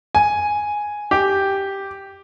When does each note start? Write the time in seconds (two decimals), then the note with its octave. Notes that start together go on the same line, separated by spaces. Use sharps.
0.15 G#5
1.11 G4